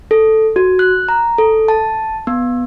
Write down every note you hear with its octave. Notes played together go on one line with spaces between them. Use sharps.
A4
F#4
F#6
A#5
A4
A5
B3